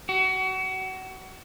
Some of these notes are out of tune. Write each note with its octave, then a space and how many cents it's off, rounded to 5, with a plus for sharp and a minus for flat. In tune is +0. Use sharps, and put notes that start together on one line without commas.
F#4 +30